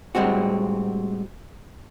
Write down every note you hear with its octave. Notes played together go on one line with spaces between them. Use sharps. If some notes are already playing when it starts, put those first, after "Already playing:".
A2 G3 G#3 C4 F#4